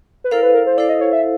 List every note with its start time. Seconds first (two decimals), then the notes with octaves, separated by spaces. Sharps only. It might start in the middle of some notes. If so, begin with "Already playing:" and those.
0.24 B4
0.31 E4 A4 A#4 C5 F5
0.43 B4
0.54 A#4
0.67 C5
0.78 E4 A4 C5 D5 F5
0.89 D#5
1.01 C#5
1.13 E5